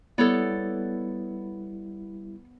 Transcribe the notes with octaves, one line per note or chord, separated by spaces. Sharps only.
G3 B3 E4 A4 C#5 D5